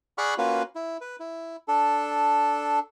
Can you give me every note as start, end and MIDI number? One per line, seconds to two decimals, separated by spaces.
0.18 0.34 68
0.18 0.34 74
0.18 0.34 78
0.18 0.34 83
0.18 0.34 85
0.18 0.34 89
0.38 0.63 58
0.38 0.63 61
0.38 0.63 65
0.38 0.63 66
0.38 0.63 71
0.76 0.97 64
1.01 1.16 71
1.20 1.56 64
1.68 2.79 62
1.68 2.79 69